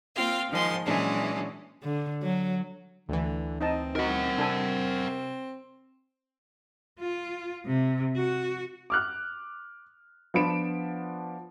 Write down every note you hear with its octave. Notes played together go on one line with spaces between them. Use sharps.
A#3 C4 F4 F5 G5
D#3 F3 G#3 C6
A#2 E3 F#3 G#3 C#4 D4
D3
F#3
D2 D3 E3
C4 D#4 D#5 A5
D#4 F#4 A#4 F#5
C3 D4 A4 G#5
F4
C3
F#4
D6 F6 F#6
F3 B3 D4 B5 D7 E7